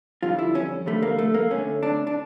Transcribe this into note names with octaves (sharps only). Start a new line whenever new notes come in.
F2 D3 G3 F4
E4
C#4
F2 D3 G3 A3
A#3
A3
A#3
D2 D3 A3 C#4
D4
D4